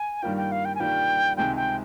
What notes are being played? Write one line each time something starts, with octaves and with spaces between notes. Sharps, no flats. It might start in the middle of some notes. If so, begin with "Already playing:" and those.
Already playing: G#5
G2 D#3 G3 A#3 F4 G5
G5
F5
G5
G#5
G2 D#3 G3 A#3 F4 G5
C#2 C3 D#3 G#3 C4 G5
G5